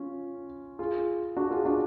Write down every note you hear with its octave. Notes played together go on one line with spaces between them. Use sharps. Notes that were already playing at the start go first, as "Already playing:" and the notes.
Already playing: C#4 F4
F4 G#4
D4 F#4
F4 G#4
D4 F#4